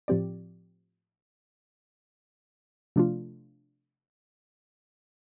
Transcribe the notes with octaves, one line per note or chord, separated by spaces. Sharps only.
A2 F3 C4 G4 D5
C3 F3 A3 D4 F4